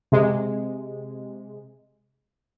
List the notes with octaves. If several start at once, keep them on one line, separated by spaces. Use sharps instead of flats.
C3 G#3